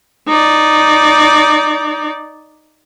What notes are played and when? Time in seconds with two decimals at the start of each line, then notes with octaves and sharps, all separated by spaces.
0.27 D#4 D5